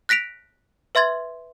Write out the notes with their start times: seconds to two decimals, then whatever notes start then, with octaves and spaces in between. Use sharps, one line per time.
0.09 F#6 A#6 B6 D7 F7
0.95 B4 E5 C6 G#6 A6